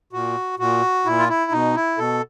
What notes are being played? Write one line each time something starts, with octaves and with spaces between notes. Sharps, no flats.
A#2 F#4
A#2 F#4
A#2 E4
F4
E4
B2 D#4
E4
B2 A4